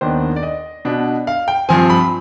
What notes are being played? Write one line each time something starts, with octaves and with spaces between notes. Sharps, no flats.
D#2 D#3 B3 D4 C5
D5
D#5
B2 B3 D4
F5
G5
G2 F3 C4 G#5
B5